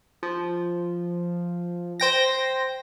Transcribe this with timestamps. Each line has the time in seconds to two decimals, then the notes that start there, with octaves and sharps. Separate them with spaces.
0.23 F3
2.00 C5 G5 A#6